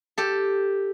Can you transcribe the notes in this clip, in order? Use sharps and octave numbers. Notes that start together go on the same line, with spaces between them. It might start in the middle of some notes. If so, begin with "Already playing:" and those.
G4 A4